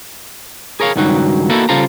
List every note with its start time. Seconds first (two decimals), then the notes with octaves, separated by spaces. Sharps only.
0.80 G#4 A#4 C#5 F5
0.96 C#2 G2 D#3 F#3 D#4 F#4
1.50 A#3 B3 D#4 E4 F#4 A4
1.69 C#3 G3 F4 A4 C5 A#5